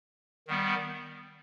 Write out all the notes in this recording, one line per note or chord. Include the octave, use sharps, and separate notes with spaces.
D#3 G3 B3